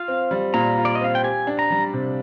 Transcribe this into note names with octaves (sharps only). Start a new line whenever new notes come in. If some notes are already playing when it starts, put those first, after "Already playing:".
Already playing: F4 F5
C4
G3
A#2 A#5
F4
D5
D#5
C4 F5
G5
G4 G#5
D4
A#5
G3
C3